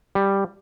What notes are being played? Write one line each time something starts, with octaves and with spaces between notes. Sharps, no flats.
G3